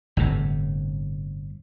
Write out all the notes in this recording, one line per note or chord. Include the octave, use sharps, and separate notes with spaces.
G1 A2 C3